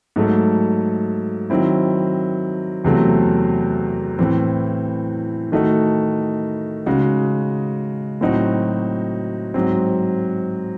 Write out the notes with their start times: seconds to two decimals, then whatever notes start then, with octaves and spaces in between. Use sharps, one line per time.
0.16 G#2 F#3 A3
1.50 D#3 F#3 C4 E4
2.84 E2 C3 F#3 A3 C4
4.19 A2 E3 C4
5.52 D#3 A3 D#4 F#4
6.86 C#3 G#3 D#4 F#4
8.21 A2 F#3 C4 D#4 F#4
9.54 G#2 F#3 C4